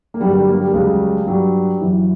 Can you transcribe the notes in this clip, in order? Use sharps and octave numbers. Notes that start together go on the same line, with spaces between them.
A#3
G2 D3 F#3 G3
G3
A#3
G3
C#2 C#3 F#3 G3
G2 F#3 G3
F#2 E3 F#3